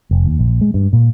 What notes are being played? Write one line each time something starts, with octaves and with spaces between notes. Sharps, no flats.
F1
D#2
A#1
G#3
G2
A#2